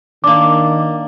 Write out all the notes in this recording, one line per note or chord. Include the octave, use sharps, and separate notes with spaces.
D#3 A#3 D4 D6